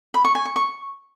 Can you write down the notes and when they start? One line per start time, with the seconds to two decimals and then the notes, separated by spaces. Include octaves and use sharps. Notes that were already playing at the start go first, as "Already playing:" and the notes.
0.14 B5
0.25 C#6
0.35 G#5
0.45 C#6
0.56 C#6